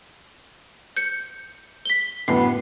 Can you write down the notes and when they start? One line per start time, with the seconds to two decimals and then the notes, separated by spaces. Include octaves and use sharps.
0.97 G6 C#7
1.85 B6 G7
2.28 F#2 A2 D3 B3 C7